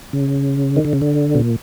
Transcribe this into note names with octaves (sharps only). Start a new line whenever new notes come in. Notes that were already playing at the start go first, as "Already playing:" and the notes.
C#3
D#3
D3
C#3
D3
B2
A#2